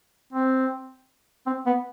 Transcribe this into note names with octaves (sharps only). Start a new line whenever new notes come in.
C4
C4
B3